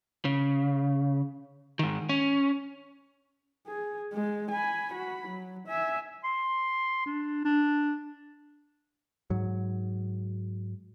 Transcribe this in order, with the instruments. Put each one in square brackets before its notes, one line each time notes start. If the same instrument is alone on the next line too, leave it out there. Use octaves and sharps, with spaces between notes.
[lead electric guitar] C#3
G#2 D#3
C#4
[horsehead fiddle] G#4
G#3
G#5 B5
F#4 B5
F#3
E5 G#5
[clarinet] C6
D4
D4
[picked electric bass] G#2 F#3